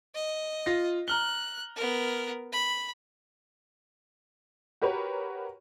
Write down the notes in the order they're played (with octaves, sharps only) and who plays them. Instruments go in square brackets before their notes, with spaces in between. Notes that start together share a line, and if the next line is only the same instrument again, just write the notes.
[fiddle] D#5
[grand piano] F4 A#6
[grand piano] A#5 F6 G7 [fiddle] F#6
[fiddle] B3 A#4
B5
[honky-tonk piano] F#4 G4 A#4 B4 C#5